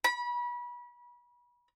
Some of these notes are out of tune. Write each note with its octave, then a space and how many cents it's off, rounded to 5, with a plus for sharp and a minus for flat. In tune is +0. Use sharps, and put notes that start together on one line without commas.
B5 -30